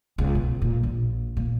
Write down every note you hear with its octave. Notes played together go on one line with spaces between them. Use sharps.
C#2
B2
A#2
A#1
A#2